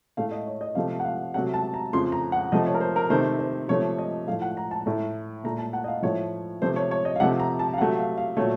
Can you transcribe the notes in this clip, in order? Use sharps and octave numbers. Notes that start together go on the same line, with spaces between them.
A2 A3 F5
D#5
C#5
D#5
C3 F3 A3 F5
F#5
F5
C3 F#3 A3 F#5
A5
A#5
F2 C#3 F3 A3 C6
A#5
F#5
C3 F3 A3 D#5
C#5
A#4
C5
A#4
C3 D#3 A3 C5
C5
C3 F3 A3 C#5
D#5
A2 F3 A3 F5
F#5
A#5
A5
A2 A3
A#2 A3 A#5
A5
F#5
D#5
F5
A2 F3 A3 C#5
C3 F3 A3 C5
C#5
C#5
D#5
F5
C3 F3 A3 F#5
A#5
A5
F5
C3 F#3 A3 F#5
F5
F5
A#2 F#3 A3 C#5